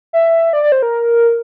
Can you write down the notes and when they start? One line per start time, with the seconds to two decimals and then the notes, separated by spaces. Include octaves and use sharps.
0.13 E5
0.53 D5
0.63 D5
0.72 C5
0.82 A#4